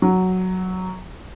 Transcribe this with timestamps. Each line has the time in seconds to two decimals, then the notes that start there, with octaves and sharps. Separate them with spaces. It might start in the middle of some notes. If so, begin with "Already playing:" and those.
0.02 F#3